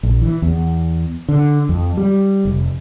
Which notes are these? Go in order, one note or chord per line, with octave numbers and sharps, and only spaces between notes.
A#1
E3
E2
D3
F2
G3
F1